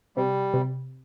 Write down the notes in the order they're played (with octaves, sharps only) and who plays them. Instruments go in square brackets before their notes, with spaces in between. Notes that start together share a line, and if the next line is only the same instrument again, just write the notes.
[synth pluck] C3 [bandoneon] G3
[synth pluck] C3